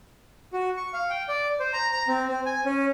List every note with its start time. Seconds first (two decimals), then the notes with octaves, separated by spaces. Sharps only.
0.53 F#4
0.77 C#6
0.93 F5
1.10 G5
1.29 D5
1.60 C5
1.73 A#5
1.92 A#5
2.08 C4
2.28 C4
2.46 G#5
2.65 C#4